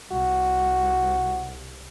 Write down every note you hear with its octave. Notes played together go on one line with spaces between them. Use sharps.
C2 F#4